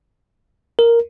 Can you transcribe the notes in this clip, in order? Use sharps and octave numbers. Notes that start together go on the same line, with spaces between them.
A#4